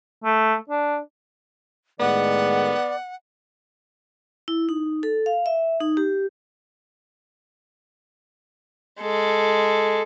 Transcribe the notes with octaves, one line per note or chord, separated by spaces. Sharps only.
A3
D4
A2 D#3 G#3 B3 D5 F#5
E4
D#4
A4
F5
E5
D#4
G4
G#3 A4